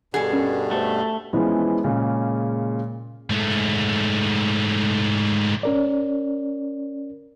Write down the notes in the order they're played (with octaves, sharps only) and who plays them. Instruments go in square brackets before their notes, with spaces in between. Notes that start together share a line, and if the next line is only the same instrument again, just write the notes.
[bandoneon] G2 B2 [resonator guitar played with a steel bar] G#4 A4 [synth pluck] F#5
[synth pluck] C#4 A#4
[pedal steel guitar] A3 [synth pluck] F#4 G4 C5
[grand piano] E3 F3 G#3 B3 C#4 E4
A#2 C#3 G#3 C#4
[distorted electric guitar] G#2 A3
[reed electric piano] C#4 A#4 D5